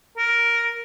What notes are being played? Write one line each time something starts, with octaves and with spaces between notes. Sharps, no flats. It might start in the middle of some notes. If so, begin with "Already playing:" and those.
A#4